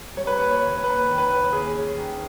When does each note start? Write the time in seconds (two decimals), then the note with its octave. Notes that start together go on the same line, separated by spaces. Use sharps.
0.17 G3 C#5
0.27 B4
0.38 A#3 C#5
0.50 C#5
0.62 D#2
0.84 A#3 B4
1.07 D#3
1.18 B4
1.29 D#2
1.53 D#2 G#4
1.75 C#4
1.97 D#3